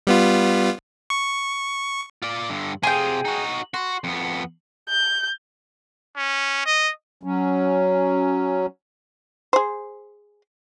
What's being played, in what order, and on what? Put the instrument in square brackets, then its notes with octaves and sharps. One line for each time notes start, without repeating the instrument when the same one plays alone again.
[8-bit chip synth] G3 B3 F4
C#6
[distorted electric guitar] F4 D5
G2 D3
[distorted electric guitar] C3 F4 [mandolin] G#4 G5
[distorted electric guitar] D#4 F#4
[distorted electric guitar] F#4 [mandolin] C6
[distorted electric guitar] F2 B3
[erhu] G6
[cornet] C#4
D#5
[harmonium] F#3 C#4
[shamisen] G#4 C5